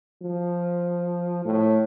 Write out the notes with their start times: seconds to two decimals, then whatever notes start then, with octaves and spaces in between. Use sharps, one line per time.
0.23 F3
1.45 A2